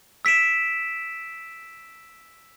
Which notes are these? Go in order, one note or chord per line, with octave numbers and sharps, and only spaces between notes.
E6 B6 D7 E7